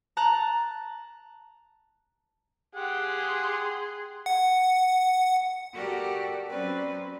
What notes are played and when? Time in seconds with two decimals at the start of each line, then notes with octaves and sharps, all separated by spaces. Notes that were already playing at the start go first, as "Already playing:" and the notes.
0.17 A5 A#5 F#6
2.75 G4 G#4 F#5 C6
4.26 F#5
5.74 F#4 G4 A4 A#4 D5 F#5
6.50 F#3 C4 C#4 B4 C5 D5